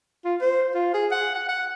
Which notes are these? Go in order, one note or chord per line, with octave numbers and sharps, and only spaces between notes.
F4
C5
F4
G#4
F#5
F#5
F#5